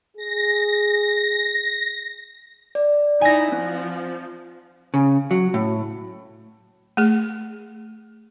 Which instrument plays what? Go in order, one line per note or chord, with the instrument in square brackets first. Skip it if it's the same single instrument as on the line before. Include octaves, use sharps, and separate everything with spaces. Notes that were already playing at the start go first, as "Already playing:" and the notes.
[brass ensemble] G#4 [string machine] A#6
[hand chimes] D5
[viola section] D#4 E4 [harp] G#5 A#6
[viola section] F3 [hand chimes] C4
[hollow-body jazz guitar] C#3
F#3
A2
[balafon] A3 G#4